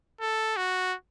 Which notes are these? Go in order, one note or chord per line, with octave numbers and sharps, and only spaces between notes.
A4
F#4